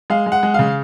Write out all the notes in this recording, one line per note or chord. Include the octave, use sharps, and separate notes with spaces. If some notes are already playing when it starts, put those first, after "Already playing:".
G#3 F5
G#3
F#5
G#3
C#3 F5